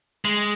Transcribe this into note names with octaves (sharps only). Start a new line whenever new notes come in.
G#3